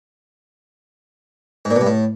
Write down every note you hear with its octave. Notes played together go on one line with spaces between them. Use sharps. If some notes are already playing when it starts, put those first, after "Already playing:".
G#2
A#2
B2
G2
A2